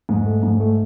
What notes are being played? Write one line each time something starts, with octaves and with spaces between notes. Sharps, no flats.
G#2
A3
G#2
A3